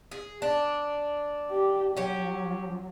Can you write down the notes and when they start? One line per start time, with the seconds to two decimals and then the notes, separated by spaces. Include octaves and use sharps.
0.12 G#4
0.42 D4
1.50 G4
1.97 F#3 C#4 G4